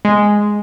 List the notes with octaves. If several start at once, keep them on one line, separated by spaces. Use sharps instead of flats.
G#3